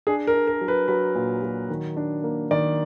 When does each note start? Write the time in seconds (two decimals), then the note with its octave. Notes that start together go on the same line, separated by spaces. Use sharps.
0.07 D4 G#4
0.27 A#4
0.34 D4
0.47 A#4
0.61 F#3
0.68 B4
0.88 F#3 B4
1.15 A#2
1.43 F#3
1.70 D#3
1.97 D4
2.23 A#3
2.51 D#3 D5